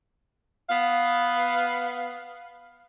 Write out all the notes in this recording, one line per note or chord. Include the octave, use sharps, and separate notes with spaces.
B3 F5